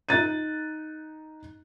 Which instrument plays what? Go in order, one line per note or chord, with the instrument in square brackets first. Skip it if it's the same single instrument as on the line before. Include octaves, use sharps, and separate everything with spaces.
[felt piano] D#4 F#6 A6 D#7